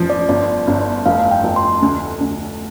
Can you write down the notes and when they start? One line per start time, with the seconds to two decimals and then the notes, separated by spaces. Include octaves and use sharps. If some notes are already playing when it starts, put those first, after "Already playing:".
Already playing: F1 F3
0.10 D5
0.29 G1 D5
0.67 G1
1.06 F1 F5
1.31 G5
1.44 F1
1.56 C6
1.82 D2
2.21 D2